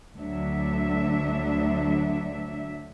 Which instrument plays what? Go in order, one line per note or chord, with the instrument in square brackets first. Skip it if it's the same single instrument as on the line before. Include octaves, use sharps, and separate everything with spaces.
[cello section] D2 F#3 D4 E5